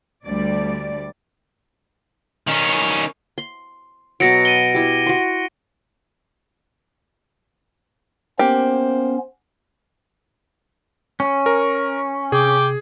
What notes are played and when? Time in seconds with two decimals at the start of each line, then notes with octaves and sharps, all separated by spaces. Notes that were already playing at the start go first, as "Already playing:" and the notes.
0.25 D2 G3 D5
2.47 D#3 C#4
3.38 C6
4.20 B2 F#3 A#6 C#7 D7
4.45 D#7 G7
4.74 E4 G4
5.07 F#4 C6
8.39 A#3 B3 C#4 G4 C5
11.20 C#4
11.46 A#4
12.32 C3 G#4 G5 D6